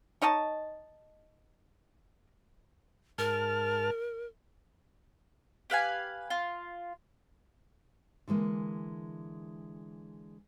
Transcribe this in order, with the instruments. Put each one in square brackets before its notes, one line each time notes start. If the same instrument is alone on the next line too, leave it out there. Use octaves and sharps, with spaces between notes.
[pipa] D#4 C#5 D#5 A5
[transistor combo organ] G#2 A5 F6 [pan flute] A#4
[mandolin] G4 B4 F5 G#5
F4
[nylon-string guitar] D3 E3 G#3 A#3